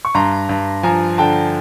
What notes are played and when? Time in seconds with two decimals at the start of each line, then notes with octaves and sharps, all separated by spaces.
0.05 C#6
0.15 G2 A#5 C6
0.49 G2
0.83 F3 G#5 A#5
1.18 D3 G5 A5